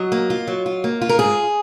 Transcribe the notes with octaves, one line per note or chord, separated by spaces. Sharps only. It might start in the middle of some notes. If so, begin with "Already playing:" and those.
Already playing: F#3 D#5
A#3
F4
F#3
F4
A#3
F4
A#4
G#2 G#4